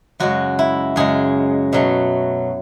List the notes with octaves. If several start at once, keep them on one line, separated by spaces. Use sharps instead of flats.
F#2 C#3 G#3 F#4
E4
F#2 C#3 G#3 G#4
B2 F#3 A3